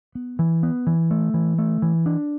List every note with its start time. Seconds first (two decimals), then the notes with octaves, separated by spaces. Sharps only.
0.15 B3
0.39 E3
0.63 B3
0.87 E3
1.11 A3
1.34 E3
1.58 A3
1.82 E3
2.06 D4